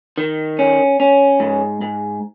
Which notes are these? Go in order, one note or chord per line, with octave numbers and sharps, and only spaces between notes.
D#3
C#4
C#4
G#2
G#2